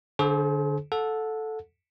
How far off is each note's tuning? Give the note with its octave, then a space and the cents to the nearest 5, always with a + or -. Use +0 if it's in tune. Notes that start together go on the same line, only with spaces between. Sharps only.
D3 +0 G#4 +45 C5 +15
A4 -5 F#5 -30